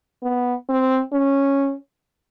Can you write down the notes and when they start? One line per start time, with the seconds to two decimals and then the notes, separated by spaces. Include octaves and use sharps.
0.23 B3
0.69 C4
1.13 C#4